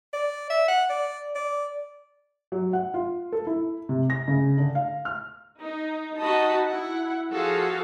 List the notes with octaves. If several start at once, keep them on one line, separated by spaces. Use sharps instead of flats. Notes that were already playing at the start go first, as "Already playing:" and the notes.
D5
E5
F#5
D5
D5
F#3
F#5
F4
A4
E4
C3
A#6
C#3
D3
F5
F6
D#4
D#4 F#4 D#5 A5 B5
E4 F#5
F3 F#4 G#4 A4 F5